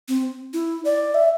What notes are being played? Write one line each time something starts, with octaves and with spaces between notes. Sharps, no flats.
C4
E4
D5
E5